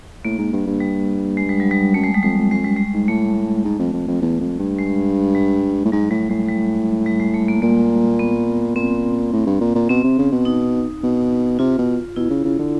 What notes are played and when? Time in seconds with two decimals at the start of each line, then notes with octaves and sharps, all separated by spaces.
0.24 A2 A#3
0.38 G#2
0.52 G2
0.66 G2
0.80 G3
1.37 G#3
1.49 G3
1.60 F#3
1.71 G3
1.94 F#2 A3
2.04 G#3
2.14 G3
2.23 F2 G#3
2.38 F2
2.51 F2 G#3
2.64 F#2 G3
2.76 G#3
2.94 G#2
3.08 A2 A3
3.65 G#2
3.79 F2
3.93 F2
4.08 F2
4.21 E2
4.41 F2
4.59 G2
4.78 G#3
5.35 G3
5.85 A2
5.92 G#2 F#3
6.11 A2 G3
6.30 A2 G#3
6.48 G3
7.06 G3
7.20 G#3
7.34 A3
7.48 A#3
7.62 A#2 A#3
8.19 B3
8.76 A#2 C4
9.33 A2
9.47 G2
9.61 A#2
9.75 A#2
9.89 B2 C4
10.04 C3
10.18 C#3
10.32 B2
10.45 D#4
11.03 B2
11.59 C3 F4
11.78 B2
12.16 B2 E4
12.30 C#3
12.45 C#3
12.59 D3